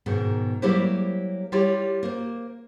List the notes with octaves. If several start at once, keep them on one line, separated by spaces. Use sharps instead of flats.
G#2 B2 D#3
F#3 G3 A#3 E4 G4 C5
G3 E4 F4 G4 C#5
A#3 C5